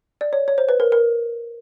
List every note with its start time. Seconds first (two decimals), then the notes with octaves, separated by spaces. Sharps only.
0.21 D5
0.33 C#5
0.48 C#5
0.58 C5
0.69 B4
0.80 A#4
0.92 A#4